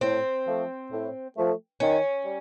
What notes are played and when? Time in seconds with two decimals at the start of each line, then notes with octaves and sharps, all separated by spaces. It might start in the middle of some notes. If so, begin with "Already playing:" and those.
0.01 A2 C4
0.46 F3 A3
0.91 A2
1.36 F3 A3
1.80 D#3 C#4
2.25 G3